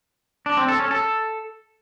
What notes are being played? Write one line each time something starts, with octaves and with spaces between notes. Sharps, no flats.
D4
C4
A4
C#4
A4